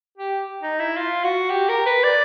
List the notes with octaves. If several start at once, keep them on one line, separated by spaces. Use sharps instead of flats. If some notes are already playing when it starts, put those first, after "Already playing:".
G4
D#4
E4
F4
F#4
G4
A#4
B4
D5